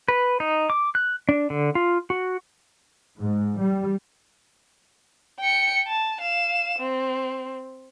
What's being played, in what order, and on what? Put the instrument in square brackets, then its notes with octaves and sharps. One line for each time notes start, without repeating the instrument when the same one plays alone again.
[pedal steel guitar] B4
D#4
D6
F#6
D4
D3
F4
F#4
[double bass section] G#2
G3
[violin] G5 C#7
A5
F5 E7
C4